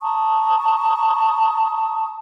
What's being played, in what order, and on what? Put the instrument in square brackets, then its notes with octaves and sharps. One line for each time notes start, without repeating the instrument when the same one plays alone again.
[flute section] A5 A#5 C#6 D#6